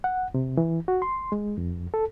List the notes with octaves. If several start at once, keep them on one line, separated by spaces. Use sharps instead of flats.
F#5
C3
E3
F#4
C6
G#3
F2
A4